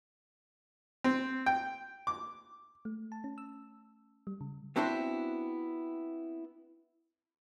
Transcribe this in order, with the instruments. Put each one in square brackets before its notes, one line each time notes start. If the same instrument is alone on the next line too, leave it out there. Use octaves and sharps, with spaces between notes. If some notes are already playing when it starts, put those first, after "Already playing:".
[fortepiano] C4
G5
D6
[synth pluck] A3
A5
C#4
E6
G3
C#3
[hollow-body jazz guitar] B3 C4 D4 E4 F#4 C5